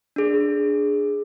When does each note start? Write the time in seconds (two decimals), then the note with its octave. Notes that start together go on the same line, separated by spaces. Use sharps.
0.16 D4 G#4